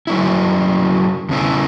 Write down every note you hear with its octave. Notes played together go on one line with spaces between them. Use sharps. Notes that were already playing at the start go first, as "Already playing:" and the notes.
F#2 F#3 C#4 E4
E2 C#3 E3 C#4 E4